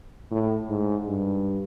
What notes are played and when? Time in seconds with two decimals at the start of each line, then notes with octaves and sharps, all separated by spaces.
0.31 A2
0.69 G#2
1.08 G2